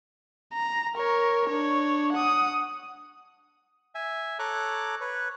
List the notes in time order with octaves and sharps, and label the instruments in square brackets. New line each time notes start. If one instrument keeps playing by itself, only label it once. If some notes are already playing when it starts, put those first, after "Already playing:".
[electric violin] A#5
A#4 C#5
D4 C#5
F#5 D#6
[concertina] E5 G#5
A4 C#5 A#5 D6 F#6
B4 C#5